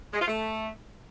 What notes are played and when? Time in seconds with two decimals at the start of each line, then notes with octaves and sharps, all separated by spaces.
0.13 G#3
0.20 F4
0.28 A3